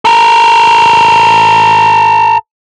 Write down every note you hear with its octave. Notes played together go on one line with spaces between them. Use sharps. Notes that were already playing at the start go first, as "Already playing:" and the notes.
A4 A#4